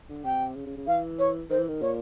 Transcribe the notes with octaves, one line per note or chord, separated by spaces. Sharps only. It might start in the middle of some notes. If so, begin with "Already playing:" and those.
D3
C3 G5
C#3
C#3
C#3
E3 F5
C#5
D#3 C5
E3
D#3
A#2 C#5